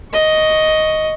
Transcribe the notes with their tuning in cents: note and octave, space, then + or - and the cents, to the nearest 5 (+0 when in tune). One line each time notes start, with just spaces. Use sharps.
D#5 +5 C#6 +0